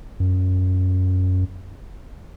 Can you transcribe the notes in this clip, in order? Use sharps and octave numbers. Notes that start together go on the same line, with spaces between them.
F#2